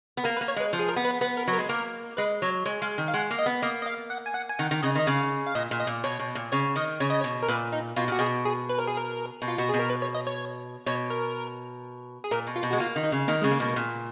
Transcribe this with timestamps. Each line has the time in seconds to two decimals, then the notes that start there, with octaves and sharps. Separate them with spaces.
0.17 B3
0.24 A#3 A#4
0.37 B4
0.41 A#3
0.48 C#5
0.56 G#3 B4
0.73 F3
0.79 G#4
0.88 A#4
0.96 B3
1.05 B4
1.21 B3 B4
1.37 A#4
1.48 F#3
1.53 A#4
1.58 G#3
1.69 A#3 A#4
2.17 G#3 B4
2.42 F#3 C#5
2.65 G#3 C#5
2.82 G#3 F5
2.98 D#3
3.08 F5
3.14 G#3 F#5
3.31 A#3
3.39 D#5
3.46 B3
3.62 A#3 D#5
3.82 D#5
3.86 F5
4.10 F#5
4.26 G#5
4.34 F#5
4.49 G#5
4.59 D#3 F#5
4.71 D#3
4.83 C#3 D#5
4.95 D#3 D#5
5.07 C#3 F5
5.47 F5
5.55 A#2 D#5
5.71 A#2
5.80 D#5
5.87 A#2
6.04 B2 C#5
6.19 B2
6.35 A#2
6.52 C#3 C#5
6.76 D#3 D#5
7.00 C#3 C#5
7.10 D#5
7.20 C#5
7.24 B2
7.43 A#4
7.48 A#2 B4
7.73 D#4
7.96 B2 F4
8.08 A#2 F#4
8.19 B2 G#4
8.45 G#4
8.69 B4
8.79 A#4
8.88 G#4
8.97 A#4
9.42 B2
9.48 F4
9.58 B2 F#4
9.69 B2 G#4
9.79 A#4
9.90 B4
10.02 C#5
10.15 D#5
10.27 C#5
10.86 B2 C#5
11.10 A#4
12.24 G#4
12.31 A#2 A#4
12.47 B2
12.56 F4
12.63 B2
12.71 G#3 F#4
12.79 A#3 F4
12.96 D#3
13.03 D#4
13.12 C#3
13.28 D#3 A#3
13.42 C#3 G#3
13.52 A#3
13.60 B2
13.76 A#2